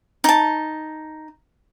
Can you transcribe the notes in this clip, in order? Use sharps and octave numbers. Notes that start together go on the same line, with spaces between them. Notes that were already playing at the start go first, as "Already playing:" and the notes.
D#4 A5